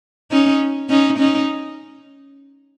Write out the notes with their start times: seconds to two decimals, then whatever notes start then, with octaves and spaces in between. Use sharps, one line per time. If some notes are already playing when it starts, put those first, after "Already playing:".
0.31 C#4 D#4
0.89 C#4 D#4
1.19 C#4 D#4